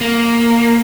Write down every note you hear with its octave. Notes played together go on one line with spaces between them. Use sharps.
A#3